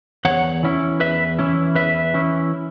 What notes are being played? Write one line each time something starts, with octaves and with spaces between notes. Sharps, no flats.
E2 C#5 F#5
E3 C#4 E4
E2 B4 E5
E3 C#4 E4
E2 B4 E5
E3 C#4 E4